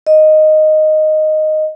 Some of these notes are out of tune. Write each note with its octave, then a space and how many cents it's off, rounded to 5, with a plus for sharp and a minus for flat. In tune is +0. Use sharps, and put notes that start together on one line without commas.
D#5 -5